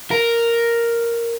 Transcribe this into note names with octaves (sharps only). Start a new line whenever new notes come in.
A#4